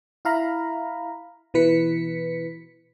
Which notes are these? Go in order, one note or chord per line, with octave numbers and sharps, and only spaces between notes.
E4 F5 A#5 B5
B2 E3 B4 B6 C#7